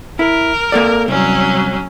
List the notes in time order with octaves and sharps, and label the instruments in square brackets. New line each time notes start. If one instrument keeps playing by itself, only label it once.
[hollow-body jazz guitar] E4 [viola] A#4
[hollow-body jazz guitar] A#3 A4 D5
[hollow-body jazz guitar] C2 [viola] F#3 C#4